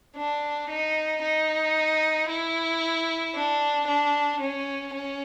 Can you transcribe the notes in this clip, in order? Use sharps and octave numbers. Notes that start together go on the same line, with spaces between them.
D4
D#4
D#4
E4
D4
D4
C#4
C#4